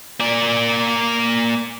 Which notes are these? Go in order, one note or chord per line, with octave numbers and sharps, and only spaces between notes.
A#3 D5